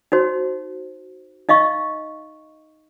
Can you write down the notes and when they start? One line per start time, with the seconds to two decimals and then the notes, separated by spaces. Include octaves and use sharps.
0.12 D#4 F#4 C5
1.49 D#4 D#5 F5 C#6